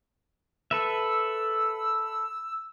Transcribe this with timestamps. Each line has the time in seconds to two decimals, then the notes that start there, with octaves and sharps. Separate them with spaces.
0.71 A4 B4 E5 E6